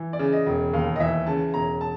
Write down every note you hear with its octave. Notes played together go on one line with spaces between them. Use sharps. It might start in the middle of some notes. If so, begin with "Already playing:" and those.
Already playing: E3
D5
C#3
D#5
E1
D#2 F5
D#5
E3 E5
C#3 A5
E1 A#5
A5